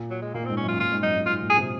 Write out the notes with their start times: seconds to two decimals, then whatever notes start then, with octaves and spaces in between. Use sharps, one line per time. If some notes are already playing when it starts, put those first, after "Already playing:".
Already playing: A#2
0.10 F#3
0.22 G#3
0.34 A#2 A#3
0.45 C4
0.49 G#2
0.57 C#4
0.64 F#2 F4
0.79 A#2 F4
0.92 G#2
1.03 F#2 D#4
1.14 G#2
1.26 G#2 F4
1.42 A#2
1.50 G#4
1.58 C3